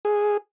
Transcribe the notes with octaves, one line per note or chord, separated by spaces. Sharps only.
G#4